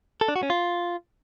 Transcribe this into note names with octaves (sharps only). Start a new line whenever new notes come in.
A4
D4
F#4
C#4
F4